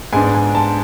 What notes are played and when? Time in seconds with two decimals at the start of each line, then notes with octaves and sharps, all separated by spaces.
0.13 G#2 G#3 B3 D4 G#5
0.35 G#5
0.55 A5